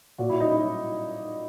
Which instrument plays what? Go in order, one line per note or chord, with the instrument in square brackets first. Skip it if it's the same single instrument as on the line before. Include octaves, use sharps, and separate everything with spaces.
[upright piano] A#2 F#4
E4
D#4
E4
F#3